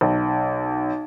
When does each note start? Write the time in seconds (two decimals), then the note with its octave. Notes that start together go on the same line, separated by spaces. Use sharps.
0.01 B1